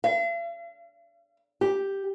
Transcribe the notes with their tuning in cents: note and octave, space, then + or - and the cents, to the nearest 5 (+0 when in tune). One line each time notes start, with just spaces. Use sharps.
F5 -45
G4 +0